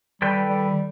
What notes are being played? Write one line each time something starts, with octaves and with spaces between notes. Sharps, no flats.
D#3 G3 A4 B4 G5
G3